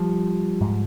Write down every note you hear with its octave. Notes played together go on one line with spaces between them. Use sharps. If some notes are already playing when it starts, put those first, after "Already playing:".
Already playing: F3 G3
G#2